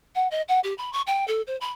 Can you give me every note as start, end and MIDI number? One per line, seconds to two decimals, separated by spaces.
0.15 0.28 78
0.31 0.42 75
0.48 0.60 78
0.64 0.74 67
0.78 0.93 83
0.93 1.01 85
1.07 1.26 79
1.28 1.42 69
1.47 1.56 72
1.61 1.72 83